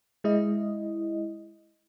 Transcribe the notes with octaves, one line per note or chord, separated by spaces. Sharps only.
G#3 E4 D#5